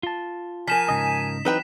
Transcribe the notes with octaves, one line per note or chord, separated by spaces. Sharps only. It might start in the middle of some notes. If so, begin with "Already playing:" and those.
F4 A5
F3 A#4 G#5 B6 E7
G#2 C#3 D#5
E3 F#3 C4 D#4 B4 G5